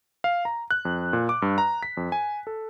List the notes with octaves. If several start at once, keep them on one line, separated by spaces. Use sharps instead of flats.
F5
A#5
F#6
F2
A#2
D6
G2
A#5
B6
F2
G#5
A4